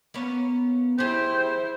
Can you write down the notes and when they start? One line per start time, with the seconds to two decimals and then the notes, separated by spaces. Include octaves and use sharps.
0.14 A#3 B3 C#4
0.98 E4 G4 G#4 C5 G5